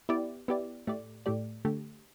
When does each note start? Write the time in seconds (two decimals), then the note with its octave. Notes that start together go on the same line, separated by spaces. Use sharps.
0.09 B3 E4 G4 D5
0.48 B3 E4 G4 D5
0.87 A2 A3 G4 D5
1.26 A2 A3 G4 D5
1.65 D3 A3 G4